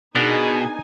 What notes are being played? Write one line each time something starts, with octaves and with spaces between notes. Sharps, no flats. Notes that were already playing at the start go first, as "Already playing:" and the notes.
B2 B3 D4 D#4 G#4 A#4 G#5